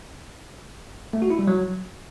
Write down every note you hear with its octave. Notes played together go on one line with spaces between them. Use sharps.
A3
F#4
E4
G3
F#3